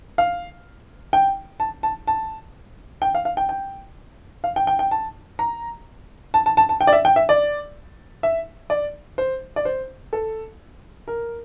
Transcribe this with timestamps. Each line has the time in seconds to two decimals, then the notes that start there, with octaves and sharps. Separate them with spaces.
0.18 F5
1.13 G5
1.60 A5
1.83 A5
2.07 A5
3.02 G5
3.15 F5
3.25 F5
3.37 G5
3.49 G5
4.44 F5
4.56 G5
4.67 G5
4.79 G5
4.91 A5
5.39 A#5
6.34 A5
6.46 A5
6.57 A5
6.69 A5
6.81 G5
6.87 D5
6.93 E5
7.05 G5
7.16 E5
7.29 D5
8.23 E5
8.70 D5
9.18 C5
9.56 D5
9.65 C5
10.13 A4
11.08 A#4